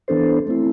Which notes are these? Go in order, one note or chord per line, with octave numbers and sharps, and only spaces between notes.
E3 B3 D4 A4 C5
A3 C4 E4